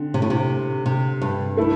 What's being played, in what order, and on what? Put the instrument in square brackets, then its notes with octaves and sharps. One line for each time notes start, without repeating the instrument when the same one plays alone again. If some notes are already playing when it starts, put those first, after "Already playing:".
Already playing: [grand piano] D3 C4
[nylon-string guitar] C3
A2
C3
C3
G2
[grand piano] A3 E4 A4